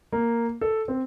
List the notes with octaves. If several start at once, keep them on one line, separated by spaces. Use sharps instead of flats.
A#3
A4
C4